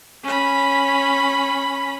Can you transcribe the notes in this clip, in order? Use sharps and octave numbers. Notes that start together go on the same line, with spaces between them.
C#4 B5